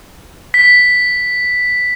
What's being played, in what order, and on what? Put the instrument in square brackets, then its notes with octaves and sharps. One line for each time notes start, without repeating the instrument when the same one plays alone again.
[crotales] B6